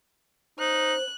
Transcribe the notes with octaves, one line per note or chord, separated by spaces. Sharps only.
D#4 C5 F#6